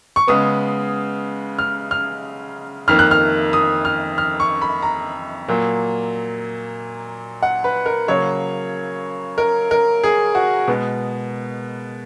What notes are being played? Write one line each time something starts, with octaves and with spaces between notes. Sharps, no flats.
C#6
C#3 G#3 B3 D#6
F6
F6
F2 D#3 A#3 F6
F#6
F6
D#6
F6
F6
C#6
B5
A#5
A#2 F#3 A#3
F#5
B4
A#4
C#3 F#3 A#3 C#5
A#4
A#4
G#4
F#4
B2 G#3 B3